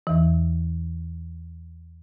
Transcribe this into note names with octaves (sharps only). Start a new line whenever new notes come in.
E2 E3